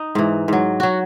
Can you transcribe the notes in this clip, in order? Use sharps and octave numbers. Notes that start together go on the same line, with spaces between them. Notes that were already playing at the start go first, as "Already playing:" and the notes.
Already playing: D#4
G#2 E3
G#2 F#3
F#3 F#4